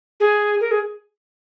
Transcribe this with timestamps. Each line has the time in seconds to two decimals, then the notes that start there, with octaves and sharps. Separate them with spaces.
0.20 G#4
0.61 A#4
0.71 G#4